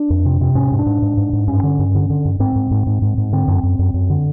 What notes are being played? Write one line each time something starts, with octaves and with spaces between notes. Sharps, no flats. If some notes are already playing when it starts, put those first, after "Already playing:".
Already playing: D4
F2
C3
C3
G#2 C#4
G#2
D4
G#2
G#2
G#2
G#2
G2 C#4
D3
G2
D3
D3
G2
G#2 C4
G#2
G#2
G#2
G#2
G#2
D3 C4
F#2
F#2
F#2
F#2
D3